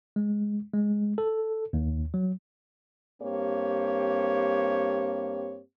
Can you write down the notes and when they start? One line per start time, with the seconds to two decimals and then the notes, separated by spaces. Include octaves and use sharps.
0.16 G#3
0.74 G#3
1.18 A4
1.73 D#2
2.14 F#3
3.21 G2 A#3 C4 G4 C#5